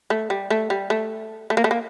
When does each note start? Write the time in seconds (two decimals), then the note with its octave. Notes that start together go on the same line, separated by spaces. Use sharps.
0.10 A3
0.30 G3
0.50 A3
0.70 G3
0.90 A3
1.50 A3
1.57 A#3
1.64 A3
1.71 A#3